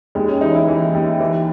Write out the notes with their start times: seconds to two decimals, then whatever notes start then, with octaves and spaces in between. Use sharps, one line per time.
0.15 D#2 G#3
0.29 C#4
0.41 E3 D#4
0.55 E4
0.68 E3
0.94 D#2
1.20 E3